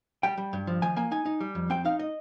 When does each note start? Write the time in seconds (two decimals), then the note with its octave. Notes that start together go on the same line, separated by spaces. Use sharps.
0.23 G3 G5
0.37 G3
0.53 G2
0.67 F3
0.82 D#3 G#5
0.96 A#3 G#5
1.11 D#4 G#5
1.25 D#4
1.41 G3
1.55 F2
1.70 C4 G5
1.85 D#4 F5
1.99 D#5